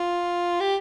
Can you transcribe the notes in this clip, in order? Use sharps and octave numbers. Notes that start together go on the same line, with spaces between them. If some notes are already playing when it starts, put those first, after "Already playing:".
Already playing: F4
G4